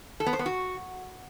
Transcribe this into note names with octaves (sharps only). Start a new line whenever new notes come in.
A4
B3
C5
B3
F#4